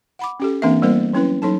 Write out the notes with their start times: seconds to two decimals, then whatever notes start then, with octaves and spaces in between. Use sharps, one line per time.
0.19 F#5 B5 D6
0.40 C#4 G4 A4
0.62 E3 A#3 C4 D4 A#4 E5
0.82 G3 A#3 B3 E4 A#4 C5
1.13 F#3 C#4 E4 B4
1.42 F#3 D#4 A4 A5